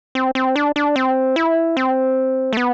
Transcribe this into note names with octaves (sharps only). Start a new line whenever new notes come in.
C4
C4
D4
D4
C4
E4
C4
A3
B3